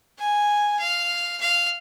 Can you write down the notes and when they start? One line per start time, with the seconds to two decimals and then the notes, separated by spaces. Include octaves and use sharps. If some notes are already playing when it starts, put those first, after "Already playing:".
0.19 G#5
0.79 F5
1.41 F5